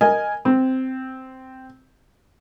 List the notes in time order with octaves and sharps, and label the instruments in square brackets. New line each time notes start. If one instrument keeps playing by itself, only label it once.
[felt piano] A#4 D#5 G#5
C4